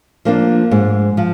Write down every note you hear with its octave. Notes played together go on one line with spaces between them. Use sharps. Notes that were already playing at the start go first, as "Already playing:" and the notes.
F3 A#3 D4
G#2
F3